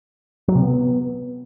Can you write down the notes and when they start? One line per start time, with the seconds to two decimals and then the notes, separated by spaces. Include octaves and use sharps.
0.48 F#3
0.55 C3
0.63 B3